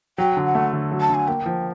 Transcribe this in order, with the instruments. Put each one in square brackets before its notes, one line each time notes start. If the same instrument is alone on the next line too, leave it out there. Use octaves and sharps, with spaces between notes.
[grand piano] F#3 [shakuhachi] G5
[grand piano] D3
[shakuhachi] F#5
[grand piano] A3
D3
F#3
[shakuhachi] A5
[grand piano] D3 [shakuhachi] G#5
[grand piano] A#3 [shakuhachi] G5
[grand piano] F3